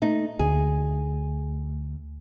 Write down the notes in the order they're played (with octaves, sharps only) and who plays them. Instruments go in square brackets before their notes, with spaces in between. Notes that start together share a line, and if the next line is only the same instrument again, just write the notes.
[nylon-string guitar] A3 D#4
[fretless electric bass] D2 [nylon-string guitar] G#4